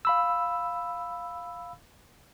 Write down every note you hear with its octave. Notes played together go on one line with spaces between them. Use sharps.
F5 B5 E6